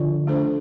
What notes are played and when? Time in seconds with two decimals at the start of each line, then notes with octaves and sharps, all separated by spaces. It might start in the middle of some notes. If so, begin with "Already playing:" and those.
Already playing: D3 F3 F4 D5
0.27 A3 D4 A4 C5